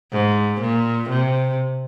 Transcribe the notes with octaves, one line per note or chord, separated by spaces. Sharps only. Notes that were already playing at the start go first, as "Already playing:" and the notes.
G#2
A#2
C3